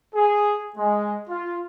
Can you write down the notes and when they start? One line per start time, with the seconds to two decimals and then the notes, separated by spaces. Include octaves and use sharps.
0.15 G#4
0.77 G#3
1.29 F4